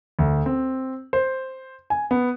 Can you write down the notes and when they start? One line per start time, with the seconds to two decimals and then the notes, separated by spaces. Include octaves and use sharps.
0.19 D2
0.46 C4
1.13 C5
1.90 G#5
2.11 B3